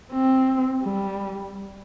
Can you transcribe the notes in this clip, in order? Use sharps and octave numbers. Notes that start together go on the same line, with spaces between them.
C4
G3